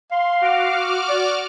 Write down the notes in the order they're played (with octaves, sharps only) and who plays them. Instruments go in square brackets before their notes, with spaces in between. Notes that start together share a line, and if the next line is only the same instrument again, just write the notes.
[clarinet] F5 [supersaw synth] C6
[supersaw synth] F#4 D6 F6
[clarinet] D5